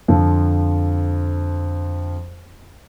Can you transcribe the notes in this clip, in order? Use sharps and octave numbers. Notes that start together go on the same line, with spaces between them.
F2 D3 F3